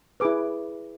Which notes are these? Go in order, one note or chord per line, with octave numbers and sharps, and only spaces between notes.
E4 G#4 B4 D6